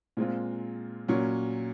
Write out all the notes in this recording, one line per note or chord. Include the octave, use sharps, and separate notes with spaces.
A#2 G#3 C4 F4
A#2 F#3 C#4